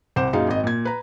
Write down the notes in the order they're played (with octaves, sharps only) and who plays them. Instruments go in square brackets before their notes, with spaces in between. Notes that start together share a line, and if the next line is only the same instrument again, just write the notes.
[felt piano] C2 C5 F#5 D6 E7
F#2 A#2 D#4 G#4 F5
G#1 D#5
A#2 G#6
B4 A#5